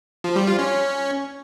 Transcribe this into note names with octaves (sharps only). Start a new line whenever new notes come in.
F3
G3
F4
C#4